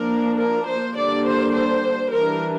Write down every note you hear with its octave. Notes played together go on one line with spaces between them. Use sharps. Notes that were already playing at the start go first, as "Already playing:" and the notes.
Already playing: F3 A#3 D4 A#4
A#4
C5
D3 G3 A#3 D4 D5
C5
C5
E3 G3 D4 A#4